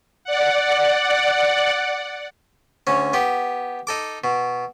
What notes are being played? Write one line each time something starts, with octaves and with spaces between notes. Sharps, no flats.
D5 F#5
D2 C#4
B3 G4
D#4 A4 D6
B2